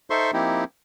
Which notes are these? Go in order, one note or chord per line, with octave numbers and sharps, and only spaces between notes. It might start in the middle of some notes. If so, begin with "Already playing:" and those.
D#4 A4 C5 E5 C6 C#6
F3 A#3 C4 D#4 E4 G4